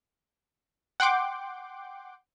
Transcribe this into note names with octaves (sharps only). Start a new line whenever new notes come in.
F#5 G5 C6 D6